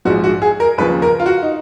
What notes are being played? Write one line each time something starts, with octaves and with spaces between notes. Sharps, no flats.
A#1 G#2 F3 F#4
F#4
G#4
A#4
D#2 C#3 F3 B4
A#4
F4
F#4
D#4